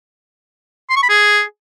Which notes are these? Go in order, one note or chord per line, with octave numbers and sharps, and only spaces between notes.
C6
C#6
B5
G#4